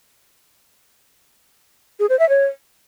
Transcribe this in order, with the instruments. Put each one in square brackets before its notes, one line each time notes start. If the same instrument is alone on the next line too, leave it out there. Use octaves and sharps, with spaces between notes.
[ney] G#4
C5
E5
C#5